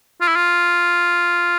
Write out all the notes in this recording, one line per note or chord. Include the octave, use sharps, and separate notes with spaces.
F4
E4
F4